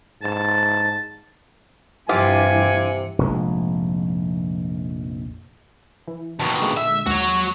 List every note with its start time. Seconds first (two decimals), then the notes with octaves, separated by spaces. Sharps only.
0.22 G#2 A5
2.09 G2 C3 E3 F4 G4 G#5
3.19 F1 A#1 G#3
6.08 E3
6.39 D#2 B2 A5
6.61 A#2 D3 G#3
6.77 E5
7.07 D#2 G#3 F#4 C#5